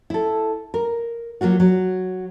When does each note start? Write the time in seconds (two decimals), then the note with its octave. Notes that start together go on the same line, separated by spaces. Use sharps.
0.10 E4 A4
0.74 A#4
1.41 F#3 A#3 F4 F#4
1.60 F#3